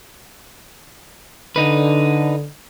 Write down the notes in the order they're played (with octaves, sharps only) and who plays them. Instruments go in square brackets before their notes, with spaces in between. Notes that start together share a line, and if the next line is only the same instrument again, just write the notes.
[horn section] D3 [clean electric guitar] D#4 B4